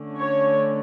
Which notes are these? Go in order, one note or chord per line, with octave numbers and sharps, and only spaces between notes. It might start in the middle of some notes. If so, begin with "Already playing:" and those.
Already playing: D3 A3 C#4
C#5